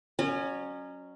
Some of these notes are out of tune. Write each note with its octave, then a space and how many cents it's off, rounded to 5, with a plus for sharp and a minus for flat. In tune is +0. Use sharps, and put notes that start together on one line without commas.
F#3 +0 C#4 +0 D#5 -40